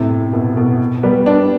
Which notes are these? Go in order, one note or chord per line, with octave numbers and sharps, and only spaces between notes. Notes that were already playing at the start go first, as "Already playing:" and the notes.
Already playing: A2 C3
B2
B2
G3 B3
B3 D4